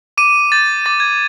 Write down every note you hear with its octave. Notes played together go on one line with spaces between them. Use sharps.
D6 D#7
G6 A6
D6 A6
G#6